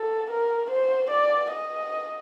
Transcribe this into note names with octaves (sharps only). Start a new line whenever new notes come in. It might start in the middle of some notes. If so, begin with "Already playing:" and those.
Already playing: A4
A#4
C5
D5
D#5